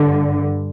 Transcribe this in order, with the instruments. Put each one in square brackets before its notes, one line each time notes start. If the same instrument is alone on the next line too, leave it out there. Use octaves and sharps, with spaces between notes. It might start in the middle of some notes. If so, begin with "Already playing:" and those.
Already playing: [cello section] G2 D3